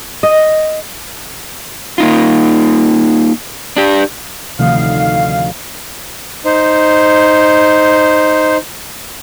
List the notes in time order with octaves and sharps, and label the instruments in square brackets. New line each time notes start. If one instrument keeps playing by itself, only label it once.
[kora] D#5
[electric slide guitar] A#3 D#4 F4
D4 G4
[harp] D2 F3 D#4 [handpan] C3 D#3 A3 [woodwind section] F5
[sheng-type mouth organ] D#4 C5